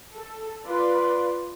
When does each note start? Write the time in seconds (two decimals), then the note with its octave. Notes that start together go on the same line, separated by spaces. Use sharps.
0.17 A4
0.66 F4 B4 D5 C6